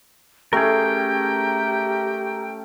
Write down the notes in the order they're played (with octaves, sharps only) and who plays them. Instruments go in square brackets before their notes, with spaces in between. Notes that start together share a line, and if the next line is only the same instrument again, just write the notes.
[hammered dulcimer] A3 C#4 [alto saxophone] G4 [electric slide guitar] G#4 A#4 [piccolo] G5